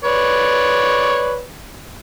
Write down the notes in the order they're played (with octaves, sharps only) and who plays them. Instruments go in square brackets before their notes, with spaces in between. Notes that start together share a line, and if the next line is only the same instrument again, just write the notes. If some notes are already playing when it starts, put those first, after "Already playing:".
[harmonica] B4 C#5 D5